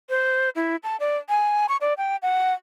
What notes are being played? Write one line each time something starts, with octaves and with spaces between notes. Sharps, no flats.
C5
E4
A5
D5
G#5
C#6
D5
G5
F#5